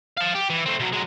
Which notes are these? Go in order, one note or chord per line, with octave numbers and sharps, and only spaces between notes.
F5 A5
G4
E3
A3 C4
B2 F#3
F#3 G#3